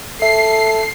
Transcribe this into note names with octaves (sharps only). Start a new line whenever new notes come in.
A4 E5 C7